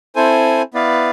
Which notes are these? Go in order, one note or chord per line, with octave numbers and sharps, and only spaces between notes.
C4 E4 A4 C5 G#5
B3 E4 B4 D5 F5